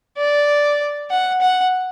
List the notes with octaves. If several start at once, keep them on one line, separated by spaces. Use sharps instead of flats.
D5
F#5
F#5